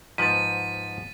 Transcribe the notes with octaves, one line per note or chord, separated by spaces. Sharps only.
G#2 F3 B4 A6 B6 D#7